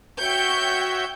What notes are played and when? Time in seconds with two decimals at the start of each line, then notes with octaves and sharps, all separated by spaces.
0.19 F#4 C#5 E5 G5 G6 C#7